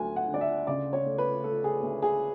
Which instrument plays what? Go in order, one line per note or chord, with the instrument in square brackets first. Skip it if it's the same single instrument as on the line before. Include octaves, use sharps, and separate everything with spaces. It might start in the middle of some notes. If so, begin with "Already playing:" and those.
Already playing: [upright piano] D2 F#3 G#5
F#5
D3
D5
E5
C#3 D5
C#5
A3
B4
A3 A4
G#4
D2
G#4